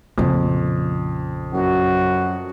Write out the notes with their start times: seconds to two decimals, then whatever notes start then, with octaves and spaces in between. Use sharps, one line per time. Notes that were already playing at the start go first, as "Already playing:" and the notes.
0.18 A#1 F2 C#3
1.53 F#2 F#4